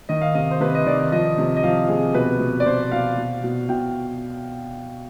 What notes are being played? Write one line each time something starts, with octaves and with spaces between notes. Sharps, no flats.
D#3 D#5
F5
C3 D#5
C5
C3 B4
D#5
D#3 D5
F3 D#5
C3
D#5
F3 F5
C3 G#4
B2 B4
B2
D5
B2 C5
B2 F5
B2
B2
B2 G5